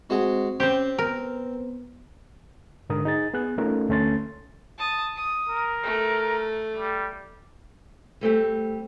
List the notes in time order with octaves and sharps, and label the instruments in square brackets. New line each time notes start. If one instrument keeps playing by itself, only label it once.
[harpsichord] G#3 F#4 [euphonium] C4
[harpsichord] C4 [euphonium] C#4 [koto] G4 C5
[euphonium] B3 [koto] A#4
[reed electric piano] G#2 D3 A#4 D#6
D#4 G#4 A6
B3 G#4 F#6
A3 C#4 D#4 F4 A4 A#4
D2 A3 C#4 C6 A6
[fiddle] A5 D#6
D#6
[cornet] A#4
[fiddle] A3
[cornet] G3
[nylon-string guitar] G3 A3 C4 G4